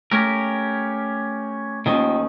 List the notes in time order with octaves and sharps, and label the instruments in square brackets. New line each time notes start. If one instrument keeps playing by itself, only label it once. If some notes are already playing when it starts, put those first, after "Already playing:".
[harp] A3 [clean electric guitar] C#4 G4 A#4
[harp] D#2 C#4 D#5 [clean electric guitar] D#3 F3